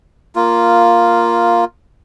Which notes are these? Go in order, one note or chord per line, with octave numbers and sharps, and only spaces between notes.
A#3 F4